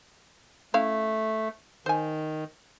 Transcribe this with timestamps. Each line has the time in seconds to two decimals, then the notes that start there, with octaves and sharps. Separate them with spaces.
0.74 A3 C#4 E4 F5
1.86 D#3 C5 G#5